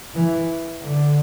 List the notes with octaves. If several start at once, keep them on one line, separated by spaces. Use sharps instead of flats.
E3
D3